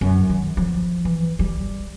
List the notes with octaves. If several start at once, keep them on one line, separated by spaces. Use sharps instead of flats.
F#2
D#3
F3
E3
G3